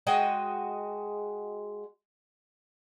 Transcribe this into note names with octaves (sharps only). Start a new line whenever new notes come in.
G#3 F#4 D#5 G5